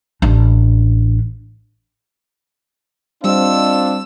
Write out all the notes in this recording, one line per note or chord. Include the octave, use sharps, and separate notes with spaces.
A1 D4
G3 C4 D4 F4 D#5 E6